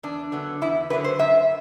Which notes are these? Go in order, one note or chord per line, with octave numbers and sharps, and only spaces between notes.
E2 D4
D3 F#3 B3
E2 E4
D3 F#3 B3 B4
C5
F#2 E5